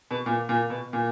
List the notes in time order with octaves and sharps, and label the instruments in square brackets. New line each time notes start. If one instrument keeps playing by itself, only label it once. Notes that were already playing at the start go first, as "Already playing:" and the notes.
[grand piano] B2
A#2
A#2
B2
A#2